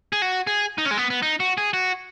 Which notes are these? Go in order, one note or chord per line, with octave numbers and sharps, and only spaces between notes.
G#4
F#4
G#4
D#4
C#4
G#3
B3
B3
D#4
F#4
G#4
F#4